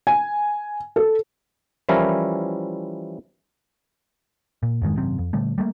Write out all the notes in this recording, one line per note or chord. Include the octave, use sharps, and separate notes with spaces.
G#5
A4
E3 F3 G3 C#4 E4 A#4
A#2
F2 G#2 D#3 G#3
G#1 F#2 C3 C4
F2
A#2 D3 G3 A3
G3 A3 A#3